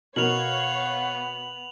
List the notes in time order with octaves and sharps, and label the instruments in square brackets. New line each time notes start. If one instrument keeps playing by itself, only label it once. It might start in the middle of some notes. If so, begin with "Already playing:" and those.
[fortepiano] B2 A#4 [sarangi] B3 [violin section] C#5 F5 [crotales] F7 F#7